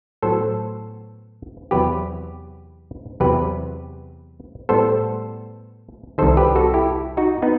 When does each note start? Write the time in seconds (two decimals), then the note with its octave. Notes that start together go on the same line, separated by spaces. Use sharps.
0.22 A2 F#3 B3 A4 C5
1.71 E2 C3 F#3 B3 G4 B4
3.20 E2 C3 F#3 G4 B4
4.69 A2 G3 B3 A4 C5
6.18 C2 C3 D#3 A4 C5
6.37 G4 B4
6.56 F#4 A4
6.74 E4 G4
7.17 D#4 F#4
7.42 B3 D#4